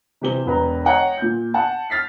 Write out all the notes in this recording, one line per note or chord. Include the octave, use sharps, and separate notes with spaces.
C3 E3 G4 C5 G7
E1 B4 A#5
C#5 D#5 F#5 G5 A#5
A#2 G6
F#5 A5
F6 A6 B6 C7